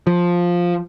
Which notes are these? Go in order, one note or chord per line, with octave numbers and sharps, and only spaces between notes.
F3